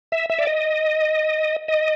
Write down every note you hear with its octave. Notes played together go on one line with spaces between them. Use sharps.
E5
E5
D5
D#5
D#5